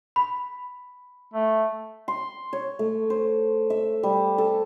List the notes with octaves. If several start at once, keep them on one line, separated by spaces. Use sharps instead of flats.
B5
A3
C6
C#5
A3
C5
E5
G3
A4